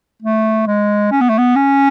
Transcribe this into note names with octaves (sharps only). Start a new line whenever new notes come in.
A3
G#3
C#4
B3
A3
B3
C#4